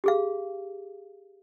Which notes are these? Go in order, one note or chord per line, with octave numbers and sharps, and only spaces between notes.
G4 G#4 F5